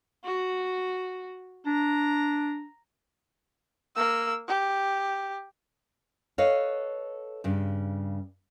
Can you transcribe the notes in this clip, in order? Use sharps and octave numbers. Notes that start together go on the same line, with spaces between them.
F#4
D4 A#5
A#3 E6
G4
A4 B4 C#5 D#5 F5
G2 C#3